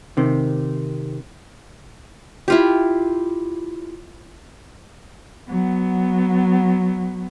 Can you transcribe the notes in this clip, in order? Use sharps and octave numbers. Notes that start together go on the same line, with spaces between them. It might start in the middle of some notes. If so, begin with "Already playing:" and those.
C3 D#3
E4 F4 G4
F#3 B3